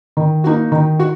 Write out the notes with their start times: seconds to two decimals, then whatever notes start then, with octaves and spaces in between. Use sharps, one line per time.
0.17 D#3
0.44 A#3 D#4 F#4
0.72 D#3
0.99 F#4